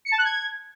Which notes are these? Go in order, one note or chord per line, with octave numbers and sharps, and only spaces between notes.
C#7
A5
F#6
G#6